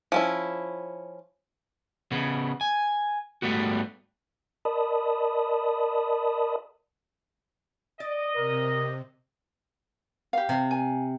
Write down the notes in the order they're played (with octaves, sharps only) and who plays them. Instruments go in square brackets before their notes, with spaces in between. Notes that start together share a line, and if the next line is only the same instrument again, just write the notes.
[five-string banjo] F3 C#4 E4
[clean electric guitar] C#3 B3
G#5
G#2 G3 A3 B3 F#4
[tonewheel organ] A#4 D5 D#5 A5 B5 D#6
[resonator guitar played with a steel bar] D5 [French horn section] D#5
[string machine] C3 [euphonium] A#4
[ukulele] G4 F5
[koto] C3
[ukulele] G#5